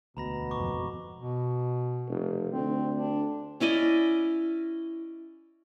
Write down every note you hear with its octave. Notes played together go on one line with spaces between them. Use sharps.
E1 D2 B2 A#5 B5 A#6
G#1 F2 A#5 C#6 D6
B2
F1
D2 C4
D4
C#4 E4 D5 D#5